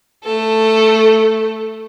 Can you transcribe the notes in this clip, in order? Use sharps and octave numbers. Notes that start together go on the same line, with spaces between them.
A3 A4